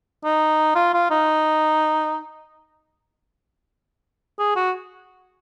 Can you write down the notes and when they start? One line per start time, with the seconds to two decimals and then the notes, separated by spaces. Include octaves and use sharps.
0.24 D#4
0.75 F4
0.94 F4
1.10 D#4
4.39 G#4
4.56 F#4